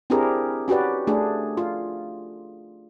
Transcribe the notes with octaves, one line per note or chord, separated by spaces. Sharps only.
C4 D4 E4 G4 G#4 A#4
C#4 F#4 G4 B4 D5
A3 D4 G#4
F4